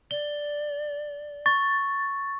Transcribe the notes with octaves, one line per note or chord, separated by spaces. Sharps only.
D5 G7
C#6 A6